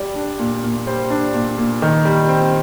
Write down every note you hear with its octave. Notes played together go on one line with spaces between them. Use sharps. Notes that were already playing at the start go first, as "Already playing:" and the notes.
Already playing: G3 D5
D4
A#2
A#2
G3 C5
D4
A#2
A#2
D#3
G3
C4